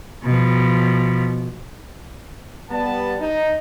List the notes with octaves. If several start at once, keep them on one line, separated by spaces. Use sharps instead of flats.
B2 F3
G3 B3 A5
D#4